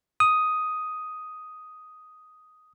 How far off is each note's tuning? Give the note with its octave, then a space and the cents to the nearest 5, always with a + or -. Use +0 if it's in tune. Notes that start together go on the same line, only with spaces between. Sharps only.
D#6 +5